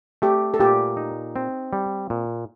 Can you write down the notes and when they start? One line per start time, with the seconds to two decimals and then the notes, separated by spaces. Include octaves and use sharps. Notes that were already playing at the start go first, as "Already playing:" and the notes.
0.22 A3 G4
0.54 A4
0.60 A#2 G4
0.97 D#4
1.36 C4
1.73 G3
2.10 A#2